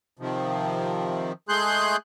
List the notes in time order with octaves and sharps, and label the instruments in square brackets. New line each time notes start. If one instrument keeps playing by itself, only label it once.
[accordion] C3 D#3 F3
G#3 A3 G#4 C6 F#6 G6